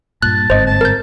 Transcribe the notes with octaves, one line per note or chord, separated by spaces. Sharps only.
G2 A#2 A5 F#6
G1 G#2 C4 C5 D#5
A5
A#4 G6